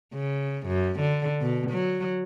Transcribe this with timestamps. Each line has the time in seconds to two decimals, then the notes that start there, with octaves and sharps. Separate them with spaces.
0.14 C#3
0.67 F#2
1.00 D3
1.41 B2
1.70 F#3